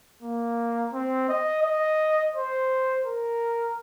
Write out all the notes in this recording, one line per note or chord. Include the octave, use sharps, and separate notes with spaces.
A#3
C4
D#5
D#5
C5
A#4